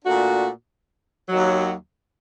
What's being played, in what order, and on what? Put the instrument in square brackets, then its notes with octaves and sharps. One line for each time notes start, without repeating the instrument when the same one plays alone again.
[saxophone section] A#2 A3 D4 F#4
D#2 D#3 F#3